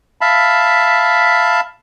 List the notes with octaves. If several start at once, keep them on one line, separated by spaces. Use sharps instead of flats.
E5 F5 A5 B5